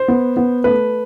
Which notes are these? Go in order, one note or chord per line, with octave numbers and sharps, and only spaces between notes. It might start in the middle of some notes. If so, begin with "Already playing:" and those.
Already playing: C5
B3
B3
A3 B4